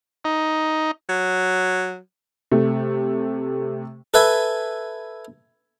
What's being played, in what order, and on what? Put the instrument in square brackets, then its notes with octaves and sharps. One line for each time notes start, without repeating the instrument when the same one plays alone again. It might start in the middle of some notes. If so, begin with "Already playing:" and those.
[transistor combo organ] D#4
[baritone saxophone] F#3
[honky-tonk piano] C3 A3
[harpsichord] A4 B4 E5 G#5